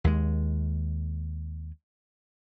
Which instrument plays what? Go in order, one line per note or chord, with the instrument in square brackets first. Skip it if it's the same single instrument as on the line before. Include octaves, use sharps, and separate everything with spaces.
[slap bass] D#2 G#3